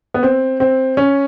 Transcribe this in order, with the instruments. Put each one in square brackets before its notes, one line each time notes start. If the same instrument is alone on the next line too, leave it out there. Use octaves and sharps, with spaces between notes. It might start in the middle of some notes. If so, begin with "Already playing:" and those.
[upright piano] B3
C4
C4
C#4